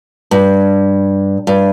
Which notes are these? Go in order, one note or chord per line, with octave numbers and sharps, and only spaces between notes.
G2
G2